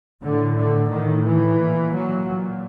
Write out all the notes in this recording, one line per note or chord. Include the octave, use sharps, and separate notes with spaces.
A2 D3
D3
A2 D#3
E3
A#2
F#3
A#2